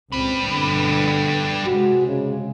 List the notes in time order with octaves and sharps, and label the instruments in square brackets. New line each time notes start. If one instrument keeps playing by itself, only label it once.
[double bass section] C#2 A#2 [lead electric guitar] G3 B4 [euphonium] C4
[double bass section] G1 G2 B2 [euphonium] D3
[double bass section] C3 G#3 [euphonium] F#4
[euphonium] C#3